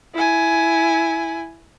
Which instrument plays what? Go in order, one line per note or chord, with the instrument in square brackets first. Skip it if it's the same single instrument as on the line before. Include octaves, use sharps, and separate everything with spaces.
[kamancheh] E4 G#5